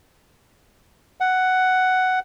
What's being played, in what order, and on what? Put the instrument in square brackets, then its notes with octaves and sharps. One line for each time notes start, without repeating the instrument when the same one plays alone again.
[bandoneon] F#5